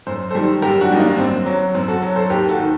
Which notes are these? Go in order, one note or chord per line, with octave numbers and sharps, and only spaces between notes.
F#2 C5
D#3 G3 A4 C5
F#2 G4 A#4
D4 F#4
D#3 G3 D#4
A#3 D4
D4
F#2 C4
F#3
F#2 C4
F#4 A4
F#3
A4 C5
D#2 G4 A#4
F#4 A4
D#3